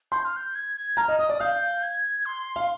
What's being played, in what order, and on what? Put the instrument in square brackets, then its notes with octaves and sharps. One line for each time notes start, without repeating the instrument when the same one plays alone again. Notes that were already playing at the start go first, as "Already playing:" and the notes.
[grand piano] C6 [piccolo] G6
[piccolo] F6
G6
G#6
G#6
[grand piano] A#5 [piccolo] F6
[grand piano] D#5
[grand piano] D#5 [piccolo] D#6
[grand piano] D5
[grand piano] F5 [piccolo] G6
[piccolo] G#6
C6
[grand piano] F5